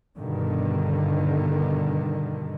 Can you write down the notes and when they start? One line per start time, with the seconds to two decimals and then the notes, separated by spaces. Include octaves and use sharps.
0.17 G2 B2 D3 D#3